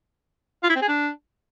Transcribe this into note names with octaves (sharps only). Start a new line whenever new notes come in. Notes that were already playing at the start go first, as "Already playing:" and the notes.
F4
E4
C4
G#4
D4